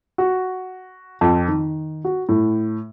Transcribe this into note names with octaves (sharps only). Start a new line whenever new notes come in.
F#4
F2
D#3
F#4
A2